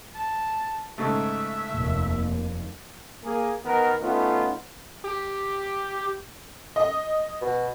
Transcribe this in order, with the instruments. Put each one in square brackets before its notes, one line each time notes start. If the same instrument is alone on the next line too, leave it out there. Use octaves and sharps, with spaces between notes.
[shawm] A5
[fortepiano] G#2 C#3 A3 [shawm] E5
[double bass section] F1 D#2
[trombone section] A#3 G#4
D#3 B3 A#4
A3 B3 C#4 D#4 F4
[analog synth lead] G4
[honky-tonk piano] D#5
[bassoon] B2